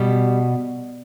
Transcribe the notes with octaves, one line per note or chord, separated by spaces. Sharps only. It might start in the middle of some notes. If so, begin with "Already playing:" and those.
Already playing: B2 G3